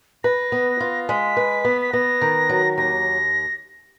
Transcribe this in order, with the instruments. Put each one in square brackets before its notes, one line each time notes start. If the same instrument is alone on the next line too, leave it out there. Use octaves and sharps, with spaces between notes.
[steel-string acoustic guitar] B4 [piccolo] A#6
[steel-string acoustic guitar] B3
F4
[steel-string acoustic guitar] G#3 [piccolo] B6
[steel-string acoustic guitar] B4
B3
[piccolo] B6
[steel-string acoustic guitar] B3 [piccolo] A#6
[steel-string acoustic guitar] D#3
F#3
[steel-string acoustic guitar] D#2 [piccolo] A#6